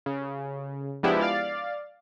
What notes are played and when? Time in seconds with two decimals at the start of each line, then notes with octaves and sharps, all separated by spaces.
0.06 C#3
1.03 F3 G#3 B3 D4 E4 G4
1.21 D5 F5 A6